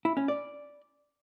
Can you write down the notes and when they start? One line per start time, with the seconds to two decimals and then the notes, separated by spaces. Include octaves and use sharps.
0.05 E4
0.17 C#4
0.28 D5